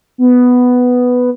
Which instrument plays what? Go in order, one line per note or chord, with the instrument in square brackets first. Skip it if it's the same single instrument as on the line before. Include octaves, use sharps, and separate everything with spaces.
[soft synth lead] B3